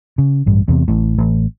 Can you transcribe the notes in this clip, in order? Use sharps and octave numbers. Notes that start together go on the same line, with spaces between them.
C#3
A1 G2
E2 C3
A1 A2
A1